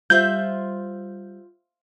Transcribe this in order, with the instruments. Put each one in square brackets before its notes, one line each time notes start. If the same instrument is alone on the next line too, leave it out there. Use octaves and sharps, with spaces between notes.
[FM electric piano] G3 [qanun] F4 C5 E5 [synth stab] G6